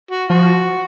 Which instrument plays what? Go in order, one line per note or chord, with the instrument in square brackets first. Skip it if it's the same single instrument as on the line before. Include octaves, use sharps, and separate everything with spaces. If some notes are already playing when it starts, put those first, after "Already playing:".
[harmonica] F#4
[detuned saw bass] F3 [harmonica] F#4